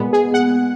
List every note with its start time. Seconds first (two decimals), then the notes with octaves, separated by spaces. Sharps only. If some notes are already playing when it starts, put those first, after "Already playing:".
Already playing: A#2 G#3 B3
0.13 G#4
0.34 F#5